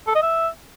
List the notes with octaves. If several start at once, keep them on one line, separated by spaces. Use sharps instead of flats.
A4
D#5
E5